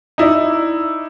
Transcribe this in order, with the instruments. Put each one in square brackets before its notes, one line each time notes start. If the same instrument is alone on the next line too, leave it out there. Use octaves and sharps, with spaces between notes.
[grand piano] D#4 E4 D5